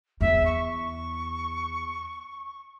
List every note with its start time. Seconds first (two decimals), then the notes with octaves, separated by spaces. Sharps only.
0.21 E2 E5
0.45 C#6